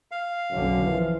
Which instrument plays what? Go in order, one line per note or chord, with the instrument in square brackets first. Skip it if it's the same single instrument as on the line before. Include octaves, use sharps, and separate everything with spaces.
[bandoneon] F5
[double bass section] F#1 B1 D3 [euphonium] F#2
[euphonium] E3 [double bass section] F3